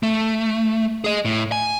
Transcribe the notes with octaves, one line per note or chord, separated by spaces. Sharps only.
A3
G#4 D#5
A2
G#5